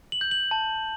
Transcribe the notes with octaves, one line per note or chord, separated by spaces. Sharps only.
F#7
G6
F#7
A5